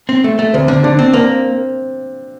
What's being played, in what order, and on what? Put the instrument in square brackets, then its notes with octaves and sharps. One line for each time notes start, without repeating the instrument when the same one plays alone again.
[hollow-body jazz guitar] C4
A3
A3
[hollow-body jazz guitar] D2 [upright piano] C4
[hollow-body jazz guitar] D3
[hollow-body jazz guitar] D3 [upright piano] D4
[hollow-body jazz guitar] C4
[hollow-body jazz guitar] A#3 [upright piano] C4